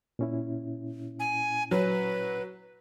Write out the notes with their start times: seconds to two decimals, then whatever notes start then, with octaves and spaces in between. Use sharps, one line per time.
0.19 A#2 C#4 E4
1.19 G#5
1.71 F#3 B4